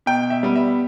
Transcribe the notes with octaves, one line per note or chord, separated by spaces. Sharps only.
B2 G5
E5
G3 B3
E5